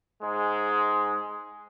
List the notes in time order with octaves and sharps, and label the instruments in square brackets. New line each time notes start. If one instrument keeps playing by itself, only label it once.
[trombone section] G#2 G#3